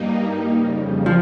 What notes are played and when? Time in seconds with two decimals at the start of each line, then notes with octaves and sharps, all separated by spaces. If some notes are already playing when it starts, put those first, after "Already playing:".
Already playing: G2 G3 A#3 D#4
0.55 F2 C#3 G3
1.06 F3